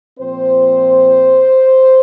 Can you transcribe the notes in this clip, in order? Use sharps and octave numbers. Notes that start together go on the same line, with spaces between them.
A#2 F3 C4 C5